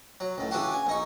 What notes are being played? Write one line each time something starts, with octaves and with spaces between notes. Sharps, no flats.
F#3
C#2 A2
C#3 E3 D4 F#4 G4
G#5
A#1 D#4 C#6